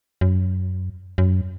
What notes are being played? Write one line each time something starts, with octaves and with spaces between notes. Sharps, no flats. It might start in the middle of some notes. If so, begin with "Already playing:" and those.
F#2
F#2